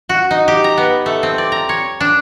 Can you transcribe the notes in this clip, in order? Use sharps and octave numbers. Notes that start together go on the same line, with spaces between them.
F#4
D#4
G4
A#5
B3
A3
C4
D5
A#5
C#5
D4